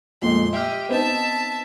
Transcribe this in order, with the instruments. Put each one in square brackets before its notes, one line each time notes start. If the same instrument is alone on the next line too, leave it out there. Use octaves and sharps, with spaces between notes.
[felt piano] F2 A#2 G#3 [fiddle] C6
[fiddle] G4 D#5 [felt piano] E5 F6
[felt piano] B3 C4 D#4 [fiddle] E5 A5